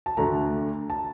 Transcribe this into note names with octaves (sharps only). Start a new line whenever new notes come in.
A5
D2 D3 A3 A#5
A5